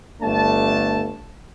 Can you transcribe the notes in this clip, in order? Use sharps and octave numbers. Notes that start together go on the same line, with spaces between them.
G1 A3 D4 A5